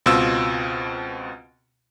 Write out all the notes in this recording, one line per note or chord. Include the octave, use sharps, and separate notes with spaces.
C#2 B2 C4 F4 E6